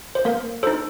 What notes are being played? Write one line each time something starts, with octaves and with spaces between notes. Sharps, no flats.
C5
A#3 A#4
D#4 A4 C5